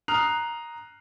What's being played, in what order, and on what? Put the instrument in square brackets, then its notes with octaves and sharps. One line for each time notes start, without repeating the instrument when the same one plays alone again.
[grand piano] A#5 D#6 F6 F#6 C7 F7